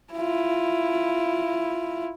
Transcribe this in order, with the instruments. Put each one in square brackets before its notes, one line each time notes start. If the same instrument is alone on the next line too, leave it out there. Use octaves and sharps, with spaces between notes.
[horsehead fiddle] E4 F4